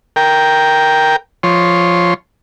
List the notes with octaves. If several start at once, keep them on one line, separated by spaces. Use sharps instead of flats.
A#4 G5
F3 C#5 C6